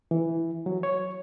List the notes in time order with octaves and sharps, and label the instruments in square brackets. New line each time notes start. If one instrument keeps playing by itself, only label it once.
[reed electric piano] E3
F#3
C#5